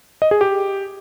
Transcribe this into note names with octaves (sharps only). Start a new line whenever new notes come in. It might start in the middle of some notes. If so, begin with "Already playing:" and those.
D#5
G#4
G4